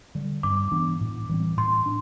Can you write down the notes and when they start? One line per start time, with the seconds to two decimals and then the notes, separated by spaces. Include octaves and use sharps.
0.15 D3 G3
0.43 G2 D6
0.72 E3 B3 D4
1.01 A2
1.29 E3 G3 C4
1.57 A2 C6
1.86 D4